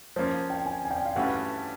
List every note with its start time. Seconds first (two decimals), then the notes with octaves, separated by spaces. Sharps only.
0.16 F3 A#3 C#4 C5
0.50 G5
0.66 G#5
0.85 G#5
0.91 G5
1.05 F5
1.15 G2 E3 A3 C#4 F#4 F#5